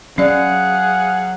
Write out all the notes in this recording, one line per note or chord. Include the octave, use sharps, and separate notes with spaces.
F#3 C#4 G#4 D5 F5 F#5